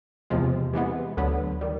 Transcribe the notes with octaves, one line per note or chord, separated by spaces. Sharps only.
E2 C3 F3 G#3
C3 E3 G#3 B3
D2 D3 F#3 B3
D#3 G3